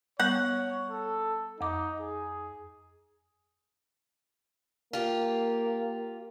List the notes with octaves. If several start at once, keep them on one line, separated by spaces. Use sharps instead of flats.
G3 B3 C#5 F#5
A4
F2 D#4 D6
G#4
A#3 F4 G4